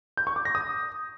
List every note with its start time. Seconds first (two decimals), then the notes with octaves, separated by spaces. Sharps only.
0.17 G6
0.27 C#6
0.36 D6
0.45 A#6
0.55 D#6